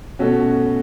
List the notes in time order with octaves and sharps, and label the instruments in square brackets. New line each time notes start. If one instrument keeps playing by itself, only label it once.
[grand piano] B2 A3 C#4 F#4 A4